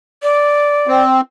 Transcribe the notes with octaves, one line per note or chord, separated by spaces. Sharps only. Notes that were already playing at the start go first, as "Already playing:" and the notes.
D5
C4